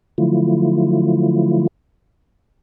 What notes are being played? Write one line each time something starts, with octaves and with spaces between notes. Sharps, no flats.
D3 F3 F#3 A3 E4 F4